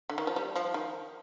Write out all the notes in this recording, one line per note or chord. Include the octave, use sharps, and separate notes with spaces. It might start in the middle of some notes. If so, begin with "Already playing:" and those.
D3
D#3
F3
G3
F3
D#3